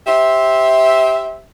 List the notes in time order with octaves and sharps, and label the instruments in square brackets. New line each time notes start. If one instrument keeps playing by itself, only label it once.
[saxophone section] G4 C5 E5